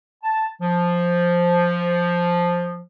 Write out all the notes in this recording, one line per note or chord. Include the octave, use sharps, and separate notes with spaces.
A5
F3